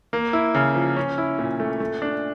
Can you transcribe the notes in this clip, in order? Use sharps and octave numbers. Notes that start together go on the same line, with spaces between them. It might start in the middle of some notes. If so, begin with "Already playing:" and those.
A#3
E4
C#3
F3
C#4
E4
A#2
A3
A3
D4